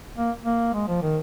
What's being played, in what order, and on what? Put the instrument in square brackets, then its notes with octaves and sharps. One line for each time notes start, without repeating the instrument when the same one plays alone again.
[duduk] A#3
A#3
G#3
F3
D#3